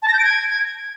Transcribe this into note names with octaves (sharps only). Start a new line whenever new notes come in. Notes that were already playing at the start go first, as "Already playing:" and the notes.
A5
A#6
G6
D7
G#6